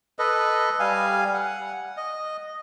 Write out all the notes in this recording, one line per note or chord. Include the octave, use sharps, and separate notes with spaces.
A4 B4 D#5
G3 F5 G#5
F#5
D#5